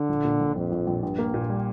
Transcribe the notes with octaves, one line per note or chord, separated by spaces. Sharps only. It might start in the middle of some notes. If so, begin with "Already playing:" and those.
Already playing: D3
A#1
A#2
A#1
A#1 F2
A#1
A#1
A#1 G2
A#3
A#2
G3